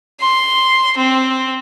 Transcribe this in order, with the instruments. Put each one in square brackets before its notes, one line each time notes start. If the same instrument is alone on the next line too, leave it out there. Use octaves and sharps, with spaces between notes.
[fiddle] C6
C4